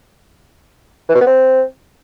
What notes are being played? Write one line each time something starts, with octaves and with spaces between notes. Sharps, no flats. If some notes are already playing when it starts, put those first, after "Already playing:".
E3
B2
B3
C4